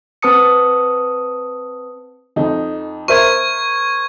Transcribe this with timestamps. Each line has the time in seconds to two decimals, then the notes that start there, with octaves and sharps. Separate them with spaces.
0.23 C4 B4 A5 D#6 C#7
2.36 F2 D#4
3.08 A#4 C5 E5 C#6 G#6